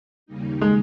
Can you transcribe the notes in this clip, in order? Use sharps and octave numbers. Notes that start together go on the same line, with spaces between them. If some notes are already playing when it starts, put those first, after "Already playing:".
D#2 C#3 G3 A#3 D#4
G#3